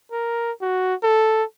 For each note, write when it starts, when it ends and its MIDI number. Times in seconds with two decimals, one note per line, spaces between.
0.12 0.52 70
0.62 0.95 66
1.03 1.44 69